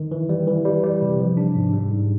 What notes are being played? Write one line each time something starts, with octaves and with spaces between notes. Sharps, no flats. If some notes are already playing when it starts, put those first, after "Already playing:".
Already playing: D#3
E3
G3
E3
G3
G3
C3
F3
D4
G#2
G3
G#2